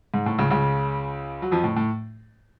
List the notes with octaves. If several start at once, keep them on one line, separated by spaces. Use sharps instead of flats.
G#2
A2
C#2 C#3
C#2 C#3
F#3
F2 F3
A2
A2